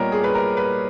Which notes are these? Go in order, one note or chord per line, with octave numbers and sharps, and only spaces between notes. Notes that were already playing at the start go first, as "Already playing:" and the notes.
Already playing: A#2 G3 B3 A#4 C#5 D#5
G#4
B4
A#4
B4